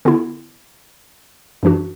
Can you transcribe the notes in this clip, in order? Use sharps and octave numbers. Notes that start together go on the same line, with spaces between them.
D3 B3 E4
F#2 E3 D4 F#4